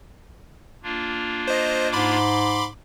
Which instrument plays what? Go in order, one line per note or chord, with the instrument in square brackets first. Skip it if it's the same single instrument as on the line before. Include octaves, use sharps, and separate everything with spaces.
[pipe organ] A#3 D4 F4
[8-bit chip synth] C5 D#5
[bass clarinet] G#2 [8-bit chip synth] B5 C6 D6